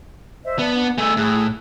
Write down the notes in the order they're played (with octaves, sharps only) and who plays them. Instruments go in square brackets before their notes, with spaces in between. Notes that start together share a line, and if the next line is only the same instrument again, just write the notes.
[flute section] C5 D#5 E5
[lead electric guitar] B3 [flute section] D5 A5
[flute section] D4 F#5
[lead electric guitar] A3 G#4 [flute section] E6
[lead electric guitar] A2 [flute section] G#4 E6 F#6